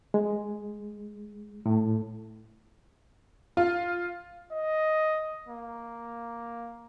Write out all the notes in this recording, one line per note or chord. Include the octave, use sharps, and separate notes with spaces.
G#3
A2
F4
D#5
A#3